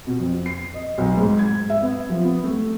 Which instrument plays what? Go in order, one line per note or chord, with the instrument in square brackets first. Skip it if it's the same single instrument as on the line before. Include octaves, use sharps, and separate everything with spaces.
[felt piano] B2
F2
C7
D#5
B1
G#2
G#6
E5
B3
F3
B3
A3